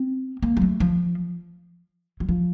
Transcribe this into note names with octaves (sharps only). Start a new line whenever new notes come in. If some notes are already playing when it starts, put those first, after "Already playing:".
Already playing: C4
A#3
F#3
A3
F3
F#3
F3